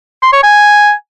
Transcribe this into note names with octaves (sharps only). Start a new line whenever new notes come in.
C6
C#5
G#5